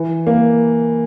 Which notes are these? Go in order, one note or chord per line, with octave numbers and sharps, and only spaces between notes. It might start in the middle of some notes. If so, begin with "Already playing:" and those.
Already playing: E3
A#3